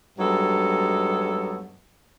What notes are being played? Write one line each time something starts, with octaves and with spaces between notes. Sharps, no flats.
G2 F#3 G#3 B3 D#4 A4